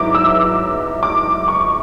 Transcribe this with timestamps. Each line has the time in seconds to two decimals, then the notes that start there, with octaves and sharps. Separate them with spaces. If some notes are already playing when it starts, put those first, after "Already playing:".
Already playing: G#2 F#3 B3 E4 D6
0.15 E6
1.03 D6
1.48 C#6